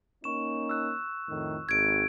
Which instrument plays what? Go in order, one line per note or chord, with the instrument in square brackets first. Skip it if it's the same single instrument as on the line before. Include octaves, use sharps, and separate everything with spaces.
[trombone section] A#3 C#4 D#4 [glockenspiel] C#6 E7
[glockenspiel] E6 F#6
[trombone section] F2 A2 D#3
[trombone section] G#1 [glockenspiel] G#6 D7